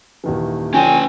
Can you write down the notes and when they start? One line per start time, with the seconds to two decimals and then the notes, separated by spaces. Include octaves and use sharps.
0.24 D#1 D#3 E3
0.74 D3 F3 C#4 G5 G#5